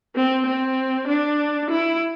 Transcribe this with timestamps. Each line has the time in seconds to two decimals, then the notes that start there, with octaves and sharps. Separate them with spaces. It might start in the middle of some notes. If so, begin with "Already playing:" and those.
0.16 C4
0.46 C4
1.07 D4
1.70 E4